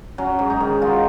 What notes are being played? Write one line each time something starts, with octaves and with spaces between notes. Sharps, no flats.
F#3 C#4
G#2
D#4
D#3
F#3 F4